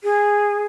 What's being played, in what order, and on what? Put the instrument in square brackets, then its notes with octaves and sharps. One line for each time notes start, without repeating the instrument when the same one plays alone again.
[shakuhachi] G#4